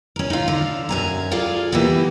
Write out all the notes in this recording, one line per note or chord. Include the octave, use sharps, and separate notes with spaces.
C#4 A#4
D#4 F4
D3 F5
F#2 G#5 A#5
F4 G#4 A4 D5 F5
E3 G3 A#3 B3